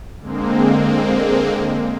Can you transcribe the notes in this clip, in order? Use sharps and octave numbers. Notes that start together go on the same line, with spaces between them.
D3 G#3 A#3 C4